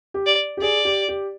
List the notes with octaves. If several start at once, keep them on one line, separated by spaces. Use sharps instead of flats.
G4
D5
G4
G#4 D5
G4
G4